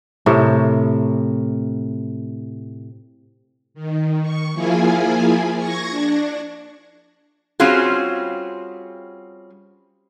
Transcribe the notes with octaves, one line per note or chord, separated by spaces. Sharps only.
A2 C3 A#4
D#3
C#6
F3 A#3 E4 F4 G#4 G#5
C#6 G#6 A#6
D4
G3 C4 C#4 F4 F#4 G#4